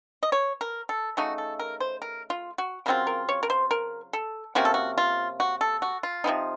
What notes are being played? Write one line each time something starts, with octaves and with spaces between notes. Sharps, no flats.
D#5
C#5
A#4
A4
C#3 A3 D#4 F#4
A4
A#4
C5
A#4
F4
F#4
C#3 F#3 C4 F4 A#4
A#4
C#5
A#4
C5
A#4
A4
C3 F3 A#3 C#4 F#4
A4
F#4
F4
F#4
A4
F#4
F4
C3 F3 C4 D#4